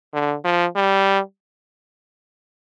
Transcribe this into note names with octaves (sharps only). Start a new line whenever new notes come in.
D3
F3
G3